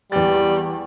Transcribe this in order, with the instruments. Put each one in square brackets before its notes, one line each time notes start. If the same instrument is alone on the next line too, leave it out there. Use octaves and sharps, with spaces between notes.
[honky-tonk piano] E2 A6 [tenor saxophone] G3